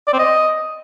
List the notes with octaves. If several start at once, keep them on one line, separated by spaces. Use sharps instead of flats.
D5
C4
D#5